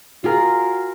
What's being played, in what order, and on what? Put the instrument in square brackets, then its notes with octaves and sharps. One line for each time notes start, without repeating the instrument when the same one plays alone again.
[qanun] F4 G#4 A#4 [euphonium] F#4